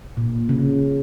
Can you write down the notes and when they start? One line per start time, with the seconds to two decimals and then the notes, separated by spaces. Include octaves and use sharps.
0.17 A#2
0.49 C#3